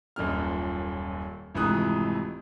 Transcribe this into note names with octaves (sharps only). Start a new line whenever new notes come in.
D#1 F#2 A#2 F6
F1 F2 G#2 E3 D#6 F#6